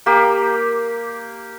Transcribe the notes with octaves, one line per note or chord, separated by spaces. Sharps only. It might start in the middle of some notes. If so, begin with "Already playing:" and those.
A#3 G4